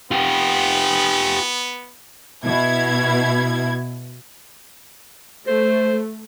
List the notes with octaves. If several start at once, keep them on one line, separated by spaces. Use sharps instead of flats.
B3 F4 G4
B2 E4 G#6
A3 C5